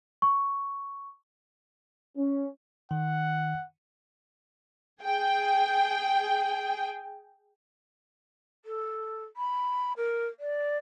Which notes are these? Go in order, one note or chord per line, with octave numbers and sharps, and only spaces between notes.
C#6
C#4
D#3 F#5
G#4 G5
A4
B5
A#4
D5